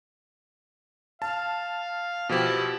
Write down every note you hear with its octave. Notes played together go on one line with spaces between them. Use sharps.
F5 A5
B2 F3 E4 G4